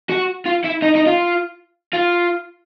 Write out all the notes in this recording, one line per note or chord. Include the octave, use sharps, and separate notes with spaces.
F#4
F4
E4
D#4
D#4
F4
F4